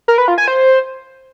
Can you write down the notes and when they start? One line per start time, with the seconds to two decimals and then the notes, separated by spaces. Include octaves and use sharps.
0.08 A#4
0.18 B4
0.28 F4
0.38 G#5
0.48 C5